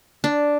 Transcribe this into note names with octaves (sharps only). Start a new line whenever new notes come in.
D4